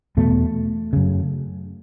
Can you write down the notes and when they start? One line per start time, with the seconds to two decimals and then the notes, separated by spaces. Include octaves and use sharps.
0.17 E2 B2 A3
0.93 F#2 C#3